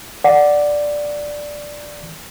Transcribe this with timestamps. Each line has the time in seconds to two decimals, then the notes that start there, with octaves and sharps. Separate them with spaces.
0.24 D5 F#5